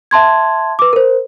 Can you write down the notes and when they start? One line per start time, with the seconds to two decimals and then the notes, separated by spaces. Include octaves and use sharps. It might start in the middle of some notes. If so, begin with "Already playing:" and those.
0.11 E5 A5 C6 G#6
0.79 B4 D6
0.93 A#4 C5